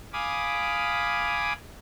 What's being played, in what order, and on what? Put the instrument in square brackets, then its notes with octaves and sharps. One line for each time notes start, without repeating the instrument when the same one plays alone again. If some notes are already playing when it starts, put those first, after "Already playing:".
[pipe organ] F5 G#5 B5 D6 D#6